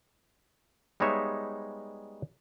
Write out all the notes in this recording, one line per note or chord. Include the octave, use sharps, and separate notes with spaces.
G3 G#3 B3 D#4 C#5 E5